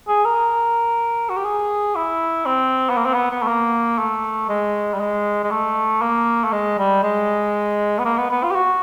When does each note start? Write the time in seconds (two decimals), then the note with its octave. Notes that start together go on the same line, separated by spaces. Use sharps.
0.08 G#4
0.25 A#4
1.30 F#4
1.37 G4
1.45 G#4
1.96 E4
2.46 C4
2.90 B3
2.97 A#3
3.06 C4
3.14 B3
3.31 B3
3.42 A3
3.48 A#3
3.99 A3
4.49 G#3
4.94 G3
5.00 G#3
5.44 G#3
5.51 A3
6.02 A#3
6.44 A3
6.52 G#3
6.78 G3
7.03 G#3
7.99 B3
8.05 A#3
8.18 B3
8.31 B3
8.43 F4
8.51 G4
8.55 F#4